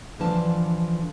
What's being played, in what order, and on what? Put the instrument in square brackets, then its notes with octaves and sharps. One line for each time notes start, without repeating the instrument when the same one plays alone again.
[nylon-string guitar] D3 E3 F3 D4 A5